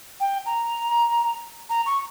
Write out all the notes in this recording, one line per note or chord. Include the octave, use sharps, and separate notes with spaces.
G5
A#5
A#5
C#6